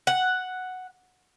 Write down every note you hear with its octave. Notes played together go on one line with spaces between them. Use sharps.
F#5